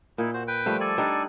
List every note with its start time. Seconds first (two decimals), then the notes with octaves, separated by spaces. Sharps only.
0.18 A#2 D#4 E4
0.34 F#4 C5
0.47 B4 G5
0.66 F3 G3 A3
0.80 A4 D5 G#5
0.98 G3 D4 D#4